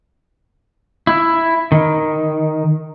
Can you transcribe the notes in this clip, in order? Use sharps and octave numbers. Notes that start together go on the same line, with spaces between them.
E4
D#3